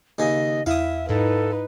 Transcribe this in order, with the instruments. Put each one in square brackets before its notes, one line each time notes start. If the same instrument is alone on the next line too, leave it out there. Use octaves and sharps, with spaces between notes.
[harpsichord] D#2 C#3 G#4 [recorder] D#5
[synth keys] E2 E4 [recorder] E5 [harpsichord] F5 D#6
[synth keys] G#2 E4 [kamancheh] D#4 B4 [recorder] A4